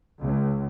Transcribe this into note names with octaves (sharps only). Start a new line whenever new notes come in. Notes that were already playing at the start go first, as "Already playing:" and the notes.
C#2